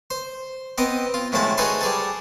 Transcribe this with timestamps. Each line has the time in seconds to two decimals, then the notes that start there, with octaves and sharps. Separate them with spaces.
0.10 C5
0.78 B3 C4 D#5 G5
1.14 F4
1.32 A2 D#3 F3 G#3 A5 B5
1.58 D#4 F#4 G#4 A4 B4 C5
1.81 G3 G#4 A4